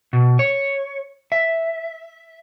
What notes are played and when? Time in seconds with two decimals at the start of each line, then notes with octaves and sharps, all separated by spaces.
0.13 B2
0.39 C#5
1.32 E5